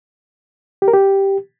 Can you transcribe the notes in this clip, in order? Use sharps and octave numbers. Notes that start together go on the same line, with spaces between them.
G4
A#4
G4